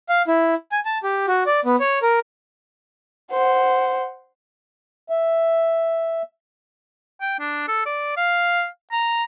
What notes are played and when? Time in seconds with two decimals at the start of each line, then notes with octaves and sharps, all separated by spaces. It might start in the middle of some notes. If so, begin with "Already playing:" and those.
0.09 F5
0.28 E4
0.72 G#5
0.85 A5
1.03 G4
1.28 F#4
1.46 D5
1.65 B3
1.80 C#5
2.02 A#4
3.32 C5 F#5
5.10 E5
7.21 G5
7.39 D4
7.68 A4
7.86 D5
8.16 F5
8.92 A#5